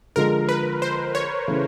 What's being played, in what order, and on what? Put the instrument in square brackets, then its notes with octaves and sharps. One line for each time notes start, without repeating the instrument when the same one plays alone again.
[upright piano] D3 F3 G#3 [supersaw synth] A#4
[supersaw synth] B4
C5
C#5
[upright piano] C#3 E3 A3